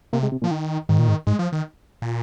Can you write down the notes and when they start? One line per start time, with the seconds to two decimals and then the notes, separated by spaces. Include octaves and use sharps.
0.13 C3 A#3
0.23 G#3
0.32 C3
0.42 A#2 F3
0.51 D#3
0.89 G#2 D#3
0.99 A#2
1.08 G#2
1.27 G#2 G#3
1.39 F3
1.52 D#3
2.02 A#2